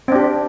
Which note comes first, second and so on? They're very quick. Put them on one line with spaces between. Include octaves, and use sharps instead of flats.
C4 D4 G4